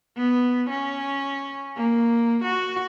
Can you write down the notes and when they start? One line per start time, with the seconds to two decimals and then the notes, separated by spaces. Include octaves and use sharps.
0.17 B3
0.69 C#4
1.76 A#3
2.43 F#4